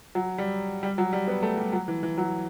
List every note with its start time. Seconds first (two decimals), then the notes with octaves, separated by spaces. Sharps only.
0.15 F#3
0.38 G3
0.83 G3
0.98 F#3
1.13 G3
1.28 B3
1.42 A3
1.57 G3
1.73 F#3
1.88 E3
2.03 E3
2.18 F#3